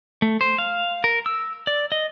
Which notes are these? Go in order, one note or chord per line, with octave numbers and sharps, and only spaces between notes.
A3
C5
F5
A#4
E6
D5
D#5